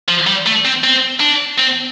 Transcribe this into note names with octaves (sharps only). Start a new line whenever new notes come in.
F3
G3
A3
C4
C4
D4
C4